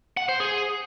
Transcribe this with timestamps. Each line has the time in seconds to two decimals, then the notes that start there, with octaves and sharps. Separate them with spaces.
0.17 F#5
0.29 C5
0.40 G#4